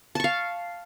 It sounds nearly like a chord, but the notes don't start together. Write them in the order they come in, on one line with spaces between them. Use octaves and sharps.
A5 C#6 F5